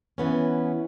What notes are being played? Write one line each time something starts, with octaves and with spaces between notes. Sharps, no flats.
E3 B3 C#4